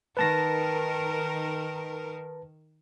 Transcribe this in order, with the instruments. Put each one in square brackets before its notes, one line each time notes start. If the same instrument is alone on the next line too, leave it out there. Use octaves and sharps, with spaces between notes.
[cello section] D#3 A#4 [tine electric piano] B4 A5 A#6